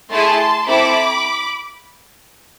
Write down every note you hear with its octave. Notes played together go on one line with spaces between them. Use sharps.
A3 E4 G#4 A5 C6
C4 E4 A4 B5 D6